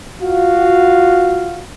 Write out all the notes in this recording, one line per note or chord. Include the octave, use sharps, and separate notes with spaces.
F4 F#4 F5